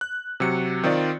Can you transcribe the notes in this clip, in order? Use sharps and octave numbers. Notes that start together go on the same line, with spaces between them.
F#6
C3 F#3 C#7
D#3 C4 F4 D5